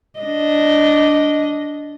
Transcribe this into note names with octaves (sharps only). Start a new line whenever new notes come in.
D4 D#5